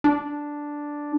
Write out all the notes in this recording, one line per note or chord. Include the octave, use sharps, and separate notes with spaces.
D4